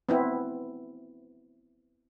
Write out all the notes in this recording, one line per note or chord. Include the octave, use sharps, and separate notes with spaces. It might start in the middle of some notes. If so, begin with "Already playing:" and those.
B3 C4 E4